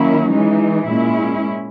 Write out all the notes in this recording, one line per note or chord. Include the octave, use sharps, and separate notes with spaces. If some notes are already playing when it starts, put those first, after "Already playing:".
Already playing: D#3 F#3 A#3 C#4 E4
E3 G#3 D#4
A#2 G#3 C#4 E4